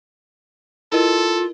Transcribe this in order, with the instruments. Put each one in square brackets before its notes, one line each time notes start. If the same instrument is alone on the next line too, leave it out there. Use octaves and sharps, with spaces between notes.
[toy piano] E4 A#4 D#5 [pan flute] F4 [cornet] A4